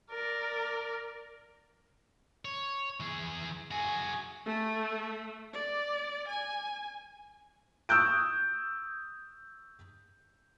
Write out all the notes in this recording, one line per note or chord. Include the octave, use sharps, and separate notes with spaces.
A#4 D5
C#5
E3 G#4
F#4 G#4 G#5
A3
D5
G#5
C#6 D#6 E6 F#6 G6 D7